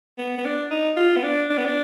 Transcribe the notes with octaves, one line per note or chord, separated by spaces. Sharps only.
B3
B3
D4
D#4
F4
B3
D4
D4
B3
D4